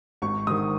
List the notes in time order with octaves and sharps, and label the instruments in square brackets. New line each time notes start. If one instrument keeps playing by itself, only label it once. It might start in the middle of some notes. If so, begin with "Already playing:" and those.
[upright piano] G#1 C#6
G#2 D#3 D#6